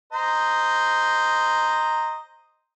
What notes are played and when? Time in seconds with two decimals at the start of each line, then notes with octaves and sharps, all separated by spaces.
0.13 C5 D#5 A#5